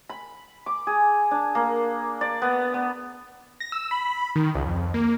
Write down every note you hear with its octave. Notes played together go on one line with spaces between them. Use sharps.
B5
D6
G#4
D4
A#3
D5
B3
B3
A#6
E6
B5
D#3
C#2
F2
A#3